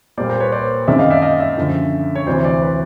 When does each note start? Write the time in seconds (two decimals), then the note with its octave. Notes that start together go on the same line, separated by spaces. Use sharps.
0.17 A#2 G3 A#3 C5 D5
0.29 A#4 C5
0.40 B4 C#5
0.52 C5 D5
0.87 F#2 D#3 G#3 C4 D5 E5
0.99 D#5 F5
1.10 D5 E5
1.22 D#5 F5
1.40 D5 E5
1.57 F#2 D3 F3
2.15 C#5
2.26 D2 C3 E3 C5 D5
2.44 C5 D5
2.62 B4 C#5